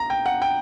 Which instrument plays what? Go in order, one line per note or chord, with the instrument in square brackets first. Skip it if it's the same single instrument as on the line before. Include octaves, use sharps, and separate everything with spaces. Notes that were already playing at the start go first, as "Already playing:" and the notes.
Already playing: [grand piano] A#5
G5
F#5
G5